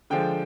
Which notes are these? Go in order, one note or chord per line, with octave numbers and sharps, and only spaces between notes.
D3 F3 G#3 G5